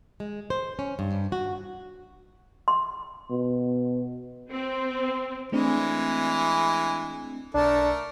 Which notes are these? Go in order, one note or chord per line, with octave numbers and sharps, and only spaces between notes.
G#3
C5
C#4
G2
F#4
C6
B2
C4
E3 G#3 A3 C4 D4
B1 A3 D4 A4 A#4